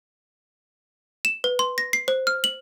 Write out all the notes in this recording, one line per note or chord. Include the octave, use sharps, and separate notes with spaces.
E7
B4
C6
A#6
C7
C5
F6
F#7